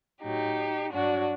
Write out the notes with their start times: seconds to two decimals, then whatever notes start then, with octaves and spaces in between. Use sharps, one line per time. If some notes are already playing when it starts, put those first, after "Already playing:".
0.22 A2 F#3 D#4 G4
0.92 G2 F#3 D4 F#4